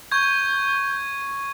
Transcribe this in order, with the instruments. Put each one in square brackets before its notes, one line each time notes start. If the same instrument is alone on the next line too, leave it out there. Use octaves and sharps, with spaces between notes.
[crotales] C#6 G#6 [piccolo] G6